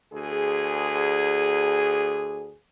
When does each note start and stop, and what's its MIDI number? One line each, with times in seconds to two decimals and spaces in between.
0.14 2.54 38
0.14 2.54 68